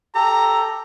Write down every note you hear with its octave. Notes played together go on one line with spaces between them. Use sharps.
G4 A4 A#5